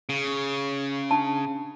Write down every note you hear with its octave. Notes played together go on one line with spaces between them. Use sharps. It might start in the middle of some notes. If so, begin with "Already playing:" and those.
C#3
D4 A5